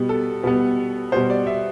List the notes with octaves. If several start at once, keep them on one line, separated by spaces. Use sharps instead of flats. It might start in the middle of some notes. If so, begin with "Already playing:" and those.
Already playing: B2 G3 B3
A4
B2 G3 B3 B4
B2 G3 B3 C5
D5
E5